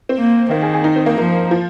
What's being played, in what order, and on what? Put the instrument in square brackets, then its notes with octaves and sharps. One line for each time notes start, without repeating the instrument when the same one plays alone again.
[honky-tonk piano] C4
[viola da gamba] A#3
[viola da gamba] D#3 [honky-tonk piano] A#3
[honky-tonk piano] G#4
G#4
D#4
C4
A#3
[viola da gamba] F3 [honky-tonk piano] A#3
[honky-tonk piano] F3